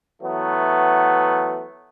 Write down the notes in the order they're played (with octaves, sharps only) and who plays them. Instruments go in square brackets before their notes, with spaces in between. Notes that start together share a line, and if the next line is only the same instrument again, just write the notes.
[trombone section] E3 F#3 A3 B3